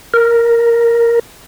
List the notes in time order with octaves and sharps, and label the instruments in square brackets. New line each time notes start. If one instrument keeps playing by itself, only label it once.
[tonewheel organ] A#4